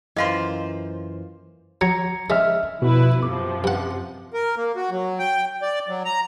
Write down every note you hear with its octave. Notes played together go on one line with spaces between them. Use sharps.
F#2 E3 A#3 F4 C5 D#5 F5 C6
F#3 A#5 G#6 C#7
C#3 G#3 D#5 E5 F6
F2 B2 E4 B4
F#2 C3 F3 D6
G2 F#5
A#4
A#3
F#4
F#3
G5
D5
F#3
A#5